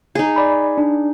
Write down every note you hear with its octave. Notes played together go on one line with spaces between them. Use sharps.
D#4 G#4
D5 B5
D4